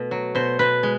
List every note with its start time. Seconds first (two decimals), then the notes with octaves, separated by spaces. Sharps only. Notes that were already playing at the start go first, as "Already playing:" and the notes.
Already playing: B2 A3
0.11 F#3
0.35 B2 C5
0.59 B2 B4
0.83 G#3